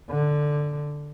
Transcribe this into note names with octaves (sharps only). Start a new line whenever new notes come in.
D3